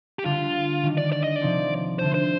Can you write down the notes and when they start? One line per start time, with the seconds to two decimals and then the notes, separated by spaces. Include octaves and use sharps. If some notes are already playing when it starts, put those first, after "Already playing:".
0.19 G4
0.25 D3 G3 D4 F4
0.83 D#3 G3 D4
0.98 D5
1.12 D5
1.24 D#5
1.36 D5
1.41 C3 F3 C4 D#4
1.99 D3 A3 D4 C5
2.14 C5